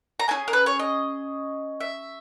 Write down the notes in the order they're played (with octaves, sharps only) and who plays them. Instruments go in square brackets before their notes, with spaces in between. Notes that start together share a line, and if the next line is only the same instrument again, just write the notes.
[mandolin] A#5
C#4 E4 G#4 G#5
A#4
B4
C#5
D#5
E5